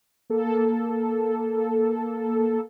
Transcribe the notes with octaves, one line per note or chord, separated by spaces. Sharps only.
A#3 A4